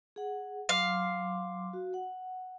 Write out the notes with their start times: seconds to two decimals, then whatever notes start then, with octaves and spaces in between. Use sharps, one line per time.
0.16 G#4 F#5
0.69 F#3 F5 C6 D6
1.73 F#4
1.94 F#5